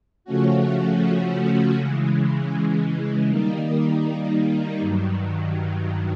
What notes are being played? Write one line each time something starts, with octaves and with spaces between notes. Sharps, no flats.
C#3 F3 A3 C#4 F#4
C#3 E3 G#3
D#3 G3 A#3 D#4
G2 D#3 F#3